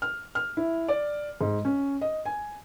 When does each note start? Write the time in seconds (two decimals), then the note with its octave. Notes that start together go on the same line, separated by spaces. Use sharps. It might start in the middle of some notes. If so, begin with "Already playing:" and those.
0.02 F6
0.35 F6
0.57 E4
0.88 D5
1.41 G#2
1.65 C#4
2.01 D#5
2.25 G#5